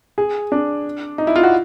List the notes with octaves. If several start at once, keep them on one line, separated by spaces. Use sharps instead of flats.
G#4
D4
D#4
E4
F4
F#4